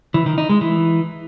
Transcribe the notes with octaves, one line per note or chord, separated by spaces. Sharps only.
E3
D#3
D#4
G#3
E3